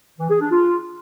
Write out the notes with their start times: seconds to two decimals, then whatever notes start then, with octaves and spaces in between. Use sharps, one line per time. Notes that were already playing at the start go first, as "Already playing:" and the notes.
0.19 E3
0.30 G#4
0.41 D4
0.52 F4